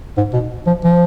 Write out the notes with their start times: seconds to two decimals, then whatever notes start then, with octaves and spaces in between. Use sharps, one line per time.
0.17 G#2
0.34 B2
0.67 F3
0.84 F3